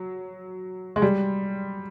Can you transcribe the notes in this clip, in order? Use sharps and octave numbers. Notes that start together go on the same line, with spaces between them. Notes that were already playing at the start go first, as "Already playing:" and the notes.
Already playing: F#3
G#3
G3